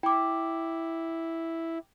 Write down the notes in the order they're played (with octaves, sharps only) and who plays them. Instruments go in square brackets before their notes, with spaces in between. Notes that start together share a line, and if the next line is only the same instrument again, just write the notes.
[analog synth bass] E4 [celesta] G5 D6